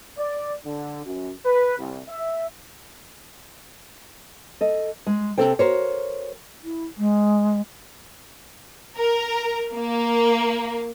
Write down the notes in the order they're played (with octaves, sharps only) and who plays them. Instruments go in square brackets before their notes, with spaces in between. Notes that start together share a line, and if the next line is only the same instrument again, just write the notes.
[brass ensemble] D5
D3
F#2
B4
C2
E5
[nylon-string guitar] A4 D#5
G#3
C3 F3 C4 A4 C5 G5
F#4 A#4 C5 C#5
[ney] E4
G#3
[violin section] A#4
A#3